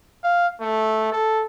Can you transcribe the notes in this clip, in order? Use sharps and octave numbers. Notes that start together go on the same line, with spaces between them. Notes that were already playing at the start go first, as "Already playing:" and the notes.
F5
A3
A4